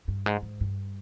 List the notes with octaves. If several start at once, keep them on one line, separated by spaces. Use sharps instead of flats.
G2
G#2
G#2
G2